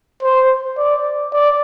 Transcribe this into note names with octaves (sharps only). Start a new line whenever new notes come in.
C5
D5
D5